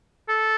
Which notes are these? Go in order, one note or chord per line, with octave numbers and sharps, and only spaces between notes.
A4